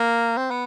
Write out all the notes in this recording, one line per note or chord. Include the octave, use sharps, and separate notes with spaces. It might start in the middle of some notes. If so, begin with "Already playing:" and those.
Already playing: A#3
C4
B3